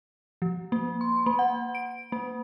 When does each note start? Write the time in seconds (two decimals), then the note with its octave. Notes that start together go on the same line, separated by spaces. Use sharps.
0.42 F3
0.72 A#3
1.01 C6
1.26 A#3
1.39 F#5
1.75 D7
2.12 A#3